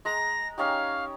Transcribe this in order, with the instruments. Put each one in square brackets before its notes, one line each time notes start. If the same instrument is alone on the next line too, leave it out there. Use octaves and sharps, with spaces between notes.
[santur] G#3 A#5 [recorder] A#6
[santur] C#4 D#4 G4 [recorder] F5